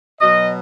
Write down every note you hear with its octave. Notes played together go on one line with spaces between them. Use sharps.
B2 F#3 D#5